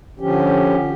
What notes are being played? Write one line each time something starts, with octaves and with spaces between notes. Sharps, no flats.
D3 F3 C#4 G4